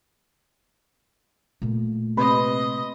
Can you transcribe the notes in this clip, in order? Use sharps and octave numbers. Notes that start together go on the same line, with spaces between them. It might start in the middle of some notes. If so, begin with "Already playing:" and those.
A#2 A3
C3 B4 D#5 B5 C6